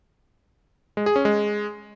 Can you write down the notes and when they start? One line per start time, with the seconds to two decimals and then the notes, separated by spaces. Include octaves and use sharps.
0.97 G#3
1.06 G#4
1.16 C#4
1.25 G#3